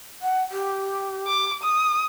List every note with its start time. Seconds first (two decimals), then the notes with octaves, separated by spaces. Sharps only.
0.22 F#5
0.51 G4
1.27 D6
1.63 D#6